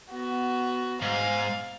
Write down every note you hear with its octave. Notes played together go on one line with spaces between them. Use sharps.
B3 F#4
G#2 F5